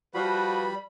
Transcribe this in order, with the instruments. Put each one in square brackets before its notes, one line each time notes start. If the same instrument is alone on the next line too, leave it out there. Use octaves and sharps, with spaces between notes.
[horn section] F3 F#4 B4 [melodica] G3 B5